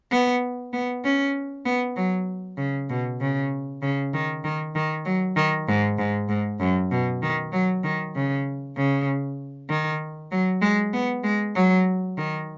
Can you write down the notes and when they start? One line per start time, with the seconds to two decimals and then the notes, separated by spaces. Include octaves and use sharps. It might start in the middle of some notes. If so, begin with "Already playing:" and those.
0.11 B3
0.73 B3
1.04 C#4
1.65 B3
1.96 F#3
2.58 C#3
2.90 B2
3.20 C#3
3.82 C#3
4.14 D#3
4.44 D#3
4.75 D#3
5.05 F#3
5.36 D#3
5.68 G#2
5.98 G#2
6.29 G#2
6.60 F#2
6.92 B2
7.22 D#3
7.53 F#3
7.84 D#3
8.15 C#3
8.77 C#3
9.70 D#3
10.31 F#3
10.62 G#3
10.93 B3
11.24 G#3
11.55 F#3
12.17 D#3